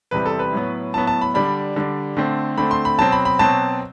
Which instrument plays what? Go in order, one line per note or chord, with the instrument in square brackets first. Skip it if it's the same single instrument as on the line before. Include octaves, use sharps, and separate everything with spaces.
[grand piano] E2 C3 G3 C4 B4
A4
B4
A2 F#3 B3
A2 F#3 B3 A5
A5
B5
D3 G3 D4 B5
D3 G3 D4
D3 A3 C4
D3 A3 C4 B5
C6
B5
B2 F#3 C4 A5
B5
B5
B2 F#3 C4 A5